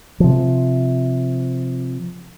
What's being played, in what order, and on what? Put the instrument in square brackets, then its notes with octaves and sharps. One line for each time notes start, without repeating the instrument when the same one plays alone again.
[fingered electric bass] C3 F3